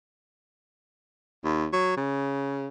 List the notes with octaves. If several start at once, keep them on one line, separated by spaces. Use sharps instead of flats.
D#2
F#3
C#3